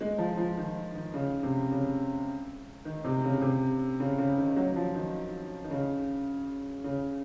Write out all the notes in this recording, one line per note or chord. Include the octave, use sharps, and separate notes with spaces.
G#3
F3
F3
D#3
D#3
C#3
C3
C#3
D#3
C3
C#3
C3
C#3
C#3
D#3
F#3
F3
D#3
D#3
C#3
C#3